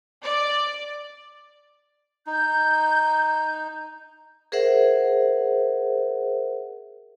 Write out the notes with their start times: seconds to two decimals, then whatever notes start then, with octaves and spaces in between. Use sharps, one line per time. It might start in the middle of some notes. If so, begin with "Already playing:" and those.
0.23 D5
2.27 D#4 G6
4.52 G#4 A#4 C5 E5 F#5